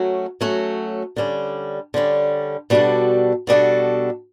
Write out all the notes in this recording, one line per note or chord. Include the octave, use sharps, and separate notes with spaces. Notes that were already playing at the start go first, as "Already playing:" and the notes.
Already playing: F#3 A3 C#4 F#4
F#3 A3 C#4 F#4
D3 G3 C#4
D3 G3 C#4
B2 G3 D4 F#4 A4
B2 G3 D4 F#4 A4